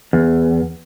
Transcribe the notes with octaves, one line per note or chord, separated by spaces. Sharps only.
E2